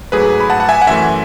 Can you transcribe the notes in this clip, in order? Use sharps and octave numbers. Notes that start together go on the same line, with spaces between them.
G#2 F#3 A3 G#4 B4
B5
F#5 A5
F#5
E5 G#5
F#5
F#2 E3 A3 E5 G#5